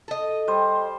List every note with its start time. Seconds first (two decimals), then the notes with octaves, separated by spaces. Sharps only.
0.08 A4 D#5
0.47 G3 C5